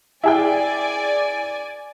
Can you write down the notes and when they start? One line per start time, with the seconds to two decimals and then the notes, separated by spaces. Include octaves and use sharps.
0.23 E4 G#4 D5 G5 G#5